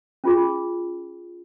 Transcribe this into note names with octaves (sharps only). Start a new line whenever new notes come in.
C#4 F4 G#4